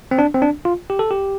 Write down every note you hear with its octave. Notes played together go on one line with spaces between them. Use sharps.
C4
D4
C4
D4
F4
G4
A4
G4